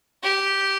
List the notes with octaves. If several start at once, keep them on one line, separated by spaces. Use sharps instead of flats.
G4